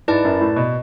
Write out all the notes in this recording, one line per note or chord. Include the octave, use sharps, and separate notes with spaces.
G#2 E4 B4 D5 A5
F#2
A2
B2